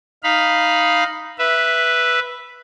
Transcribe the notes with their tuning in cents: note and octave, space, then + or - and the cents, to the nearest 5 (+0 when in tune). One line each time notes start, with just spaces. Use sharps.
D#4 +0 F5 +0 B5 +0
B4 -5 E5 +0